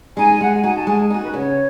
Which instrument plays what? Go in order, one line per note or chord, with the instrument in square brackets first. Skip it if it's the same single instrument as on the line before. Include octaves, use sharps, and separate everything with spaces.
[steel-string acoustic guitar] G#3 D#4 [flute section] G#5
[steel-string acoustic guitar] G#3 [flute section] F#5
[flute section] G#5
[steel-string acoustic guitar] D#4 F#4 [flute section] G#5
[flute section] A5
[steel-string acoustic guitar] G#3 [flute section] G#5
[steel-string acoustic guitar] D#4 F#4 [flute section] G#5
[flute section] B4
[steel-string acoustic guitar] C#3 [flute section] C#5